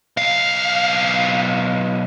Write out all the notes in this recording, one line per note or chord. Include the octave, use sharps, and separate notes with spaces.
B1 F5